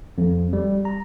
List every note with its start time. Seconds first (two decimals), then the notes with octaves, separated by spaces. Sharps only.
0.18 F2
0.53 G3
0.85 A#5